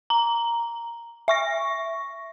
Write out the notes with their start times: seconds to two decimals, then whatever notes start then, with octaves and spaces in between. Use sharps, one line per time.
0.10 A#5
1.28 E5 C#6 A#6